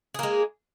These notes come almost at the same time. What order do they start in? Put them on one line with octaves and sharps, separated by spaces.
G#4 A#3 G#3